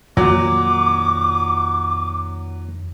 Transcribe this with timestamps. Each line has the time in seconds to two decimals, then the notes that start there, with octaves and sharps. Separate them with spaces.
0.17 F2 A#2 D#3 F#3 C#4 D6